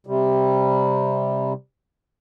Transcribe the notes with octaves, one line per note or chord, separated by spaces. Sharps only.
C3 G3